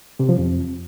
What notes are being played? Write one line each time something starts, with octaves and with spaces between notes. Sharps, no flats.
C3
F3
F2